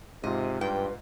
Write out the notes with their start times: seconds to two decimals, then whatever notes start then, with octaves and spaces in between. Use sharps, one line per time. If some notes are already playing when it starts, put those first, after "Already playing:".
0.24 G#2 C3 F4 D#5
0.61 G2 B4 G5